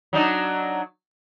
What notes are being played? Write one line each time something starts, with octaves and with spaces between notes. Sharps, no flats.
F#3 D4 D#4